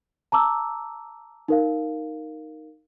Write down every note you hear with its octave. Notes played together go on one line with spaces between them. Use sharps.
A5 A#5 D6 E6
D#4 A#4 F5